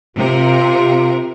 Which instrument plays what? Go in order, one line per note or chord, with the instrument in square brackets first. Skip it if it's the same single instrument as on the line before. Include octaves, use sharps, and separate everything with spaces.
[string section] C3 A#4 [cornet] F4